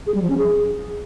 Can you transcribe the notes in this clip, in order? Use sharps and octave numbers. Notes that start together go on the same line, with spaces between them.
G#4
G3
F3
C#4
G#4